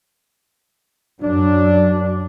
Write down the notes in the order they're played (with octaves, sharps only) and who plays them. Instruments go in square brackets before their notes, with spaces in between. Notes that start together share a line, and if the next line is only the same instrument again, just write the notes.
[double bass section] F#2 F#3 [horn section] D4